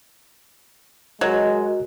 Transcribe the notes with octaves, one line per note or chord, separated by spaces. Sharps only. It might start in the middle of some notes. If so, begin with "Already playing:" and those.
F#3 G#3 F#4 A#4 D#5